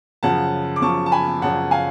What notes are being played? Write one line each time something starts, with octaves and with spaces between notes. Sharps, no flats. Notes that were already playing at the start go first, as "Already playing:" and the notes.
F#2 C#3 F3 F#5 A5
D6
F#2 C#3 F3 A5 C#6
A5
G#5 B5
F#2 C#3 F3 F#5 A5
F5 G#5